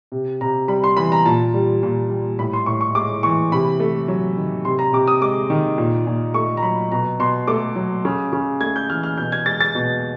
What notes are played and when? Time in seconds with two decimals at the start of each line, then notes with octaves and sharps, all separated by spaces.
0.12 C3
0.41 C3 A#5
0.68 G3 B5
0.84 C6
0.97 E3 B5
1.12 A#5
1.25 A#2 A5
1.54 G3
1.83 A#2
2.10 G3
2.39 A2 B5
2.53 C6
2.66 A2 C#6
2.81 C#6
2.95 G#3 D6
3.23 E3 C#6
3.52 C3 B5
3.80 A3
4.08 F#3
4.37 D#3
4.65 C3 C6
4.79 A#5
4.93 C3 D6
5.08 D#6
5.21 G#3 D6
5.50 D#3
5.78 A#2
6.07 A#2
6.34 A3 C#6
6.57 A#5
6.63 F#3 B5
6.92 B2 A#5
7.19 B2 C6
7.47 A3 D6
7.76 F#3
8.05 C#3
8.33 C#3
8.61 A3 G#6
8.76 G6
8.90 E3 F6
9.03 F6
9.17 B2 G6
9.32 G#6
9.46 G#3 A6
9.61 A6
9.75 B2